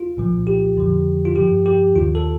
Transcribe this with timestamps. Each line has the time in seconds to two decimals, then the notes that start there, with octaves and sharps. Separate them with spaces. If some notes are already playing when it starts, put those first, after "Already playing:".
Already playing: F4
0.17 C2 A#2 F3
0.47 G4
0.76 F2 D3 F3
1.25 F4
1.36 G2 F3 G4
1.66 G4
1.95 D#2 D#3 F4
2.15 A4